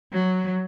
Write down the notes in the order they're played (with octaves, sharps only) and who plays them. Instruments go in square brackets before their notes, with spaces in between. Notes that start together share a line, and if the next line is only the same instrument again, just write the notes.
[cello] F#3